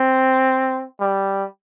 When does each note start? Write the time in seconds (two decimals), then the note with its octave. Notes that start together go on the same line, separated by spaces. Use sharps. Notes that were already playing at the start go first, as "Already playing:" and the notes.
Already playing: C4
1.00 G3